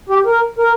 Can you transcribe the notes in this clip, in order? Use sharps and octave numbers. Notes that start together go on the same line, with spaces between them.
G4
A#4
A#4